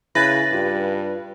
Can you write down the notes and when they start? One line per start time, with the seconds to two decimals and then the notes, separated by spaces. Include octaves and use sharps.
0.15 C#3 E4 B4 E5 G#5 A6 A#6
0.52 G2 F4 G4